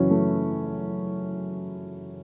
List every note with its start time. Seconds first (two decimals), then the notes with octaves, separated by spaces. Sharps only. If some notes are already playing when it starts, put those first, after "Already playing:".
Already playing: F#2 C#3 E3 C#4 E4 F#4
0.11 A3